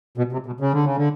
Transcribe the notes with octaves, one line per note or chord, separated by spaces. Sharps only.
B2
C3
B2
C#3
D3
C#3
D3